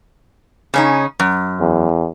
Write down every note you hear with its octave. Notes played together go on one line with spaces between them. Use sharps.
C#3 C#4 D#4
F#2
E2